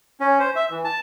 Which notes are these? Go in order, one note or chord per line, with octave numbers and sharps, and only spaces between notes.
C#4
C5
E5
E3
A5